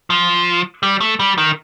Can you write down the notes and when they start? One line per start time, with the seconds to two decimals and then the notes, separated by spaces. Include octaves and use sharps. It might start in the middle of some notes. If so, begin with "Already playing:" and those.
0.10 F3
0.83 G3
1.01 A3
1.20 G3
1.38 D#3